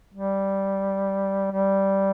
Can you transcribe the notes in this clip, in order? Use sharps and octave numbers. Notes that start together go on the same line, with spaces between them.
G3
G3